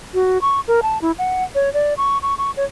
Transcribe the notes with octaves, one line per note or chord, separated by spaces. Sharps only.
F#4
C#6
A#4
A5
E4
F#5
C#5
D5
C#6
C#6
C#6
C#5